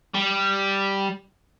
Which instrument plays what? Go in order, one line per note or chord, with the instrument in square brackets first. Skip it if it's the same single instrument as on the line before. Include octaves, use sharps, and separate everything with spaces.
[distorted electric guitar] G3